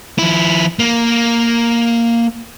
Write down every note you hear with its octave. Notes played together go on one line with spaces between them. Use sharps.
F3 E4
A#3